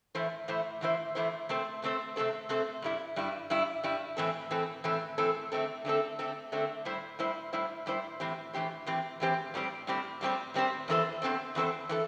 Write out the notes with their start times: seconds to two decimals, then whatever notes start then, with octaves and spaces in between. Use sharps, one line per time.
0.15 A2 E3 A3 E4 C5
0.48 A2 E3 A3 E4 C5
0.81 A2 E3 A3 E4 C5
1.15 A2 E3 A3 E4 C5
1.49 C3 A3 C4 A4 C5
1.82 C3 A3 C4 A4 C5
2.16 C3 A3 C4 A4 C5
2.49 C3 A3 C4 A4 C5
2.82 G2 G3 E4
3.16 G2 G3 E4
3.50 G2 G3 E4
3.83 G2 G3 E4
4.17 A2 E3 C4 A4
4.51 A2 E3 C4 A4
4.84 A2 E3 C4 A4
5.18 A2 E3 C4 A4
5.52 D3 A3 C4 A4
5.85 D3 A3 C4 A4
6.19 D3 A3 C4 A4
6.52 D3 A3 C4 A4
6.85 A2 G3 E4 C5
7.19 A2 G3 E4 C5
7.53 A2 G3 E4 C5
7.86 A2 G3 E4 C5
8.20 A2 E3 C4 G4 C5
8.54 A2 E3 C4 G4 C5
8.86 A2 E3 C4 G4 C5
9.20 A2 E3 C4 G4 C5
9.54 A2 G3 C4 G4 C5
9.87 A2 G3 C4 G4 C5
10.21 A2 G3 C4 G4 C5
10.54 A2 G3 C4 G4 C5
10.88 E2 E3 C4 A4 C5
11.22 E2 E3 C4 A4 C5
11.55 E2 E3 C4 A4 C5
11.89 E3 C4 A4